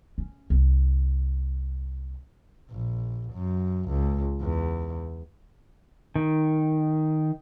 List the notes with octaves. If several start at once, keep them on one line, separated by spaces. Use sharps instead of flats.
C#4
C2
A#1
F#2
C#2
E2
D#3